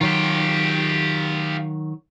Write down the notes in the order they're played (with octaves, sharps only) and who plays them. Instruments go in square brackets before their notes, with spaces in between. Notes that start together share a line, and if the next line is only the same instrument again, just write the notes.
[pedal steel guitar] D#3 F#3 [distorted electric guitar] F4 G4